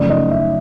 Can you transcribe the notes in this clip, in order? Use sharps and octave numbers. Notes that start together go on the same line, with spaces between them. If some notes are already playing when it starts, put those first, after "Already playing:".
Already playing: F#2 C#3 F3 A3 D5
D#5
E5